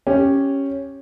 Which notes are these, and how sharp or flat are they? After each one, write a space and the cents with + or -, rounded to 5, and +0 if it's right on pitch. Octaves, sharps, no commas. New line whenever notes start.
C#4 -5 G4 +5